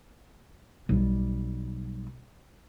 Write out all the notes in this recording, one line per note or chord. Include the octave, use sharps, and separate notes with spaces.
B1 G3